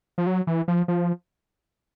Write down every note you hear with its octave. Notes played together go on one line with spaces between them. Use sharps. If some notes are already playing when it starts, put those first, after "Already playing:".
F3
F#3
E3
F3
F3